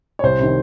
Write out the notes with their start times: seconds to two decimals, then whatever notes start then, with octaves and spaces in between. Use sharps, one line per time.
0.19 C#5
0.23 C2 C5
0.40 C3 D#3